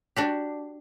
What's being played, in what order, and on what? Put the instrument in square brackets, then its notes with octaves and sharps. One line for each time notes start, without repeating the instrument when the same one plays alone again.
[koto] D4 F#4 G4